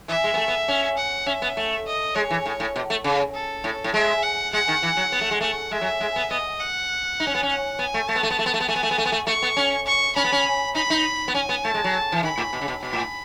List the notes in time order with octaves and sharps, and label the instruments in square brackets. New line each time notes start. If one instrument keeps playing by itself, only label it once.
[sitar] E3 [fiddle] E5
[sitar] G#3
B3
A3
B3
C#4
[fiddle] F#5
[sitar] C#4 [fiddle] E5
[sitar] B3
A3
[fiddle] D#5
[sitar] G#3 [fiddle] C#5
[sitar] E3
A2
A2
B2
A3
C#3
[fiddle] A4
[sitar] A2
A2
[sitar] G#3 [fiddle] E5
[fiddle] F#5
[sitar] G#3 [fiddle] F#5
[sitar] D#3
E3
F#3
B3
A3
G#3
[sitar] A3 [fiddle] F#5
[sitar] G#3 [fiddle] E5
[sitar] F#3
G#3
B3
[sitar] B3 [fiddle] D#5
[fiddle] F#5
[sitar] D#4
C#4
B3
C#4
[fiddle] F#5
[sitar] B3 [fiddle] G#5
[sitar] A3
[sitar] A3 [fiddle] A5
[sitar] B3
A3
B3
A3
B3
A3
B3
[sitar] A3 [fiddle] G#5
[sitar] B3
A3
B3
A3
B3
A3
[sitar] A3 [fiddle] C#6
[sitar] B3
C#4
[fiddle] C#6
[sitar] C#4 [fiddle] B5
[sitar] B3
C#4
[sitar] D#4 [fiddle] B5
[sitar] D#4
B3
[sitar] C#4 [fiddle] G#5
[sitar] B3
[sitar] A3 [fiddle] A5
[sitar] G#3
F#3
E3
[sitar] D#3 [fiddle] B5
[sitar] A2
B2
C#3
B2
[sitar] B2 [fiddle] B5
[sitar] A2